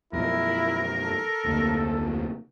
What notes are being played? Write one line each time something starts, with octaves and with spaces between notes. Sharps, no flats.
F#2 B2 F3 E4 A#4
A4
F1 D2 A#3